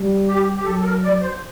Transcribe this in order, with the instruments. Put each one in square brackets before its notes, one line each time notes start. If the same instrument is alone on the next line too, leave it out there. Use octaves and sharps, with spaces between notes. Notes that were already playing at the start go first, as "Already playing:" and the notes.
Already playing: [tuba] G3
[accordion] G4
G4
[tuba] F#3 [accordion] A4
[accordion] A4
A#4
D5
C5